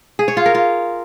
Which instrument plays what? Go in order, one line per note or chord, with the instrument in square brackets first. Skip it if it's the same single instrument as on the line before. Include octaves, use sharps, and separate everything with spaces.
[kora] G#4
C#5
F4
A#4
F4